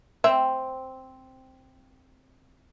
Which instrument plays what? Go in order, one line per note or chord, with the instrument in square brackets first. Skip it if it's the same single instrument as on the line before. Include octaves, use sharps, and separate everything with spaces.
[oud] C4 [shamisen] E5